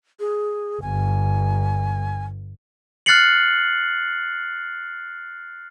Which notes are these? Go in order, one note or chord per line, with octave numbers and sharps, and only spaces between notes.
G#4
G1 G#5
F6 F#6 A6 C7 C#7 F#7